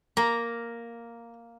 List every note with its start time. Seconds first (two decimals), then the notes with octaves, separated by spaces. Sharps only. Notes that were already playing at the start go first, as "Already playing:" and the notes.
0.17 A#3 A#5